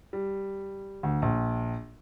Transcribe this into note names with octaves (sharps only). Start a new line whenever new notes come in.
G3
D2
A#1